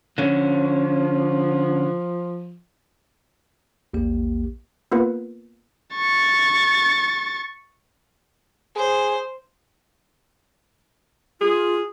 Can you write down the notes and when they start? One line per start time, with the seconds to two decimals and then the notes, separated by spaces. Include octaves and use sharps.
0.18 D3 F3 C#4
3.93 A#1 E2 A#3 G4
4.92 A#3 B3 F4 A#4 B4
5.95 C#6 A6
8.76 G#4 C5
11.41 F4 G#4